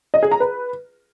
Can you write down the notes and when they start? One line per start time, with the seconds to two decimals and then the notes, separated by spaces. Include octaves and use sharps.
0.14 D#5
0.23 G#4
0.31 A#5
0.40 B4